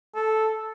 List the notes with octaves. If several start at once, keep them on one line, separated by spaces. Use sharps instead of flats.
A4